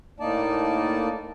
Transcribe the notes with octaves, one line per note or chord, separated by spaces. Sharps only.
A2 A#3 D#4 D5 A5